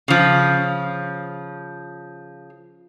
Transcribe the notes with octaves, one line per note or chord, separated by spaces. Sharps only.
C#3 F3